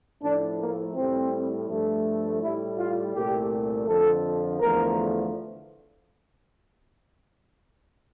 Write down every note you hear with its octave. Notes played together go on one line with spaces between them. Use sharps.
A2 F3 A3 D4
A#3
A2 G3 C4
G2 F3 A3
A2 G3 E4
F4
C2 A#2 A3 G4
F2 D3 F3 A4
E2 D3 F3 A3 A#4